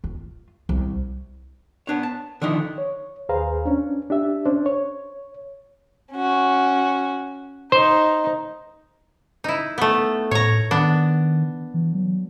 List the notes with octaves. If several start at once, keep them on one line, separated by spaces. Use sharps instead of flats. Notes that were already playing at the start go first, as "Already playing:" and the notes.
F4
C2
B3 D4 C#5
A5
D3 D#3 F3 D#4 E4
C#5
D#2 G#4 B4 C5 F5 A#5
C#4 D4
D4 G4 E5
C#4 D4 C5
C#5
C#4 F#4
D#4 C5
D#4 E4
A3 B3
A2 C#5 A#5
D#3 B3 D4
E3
F#3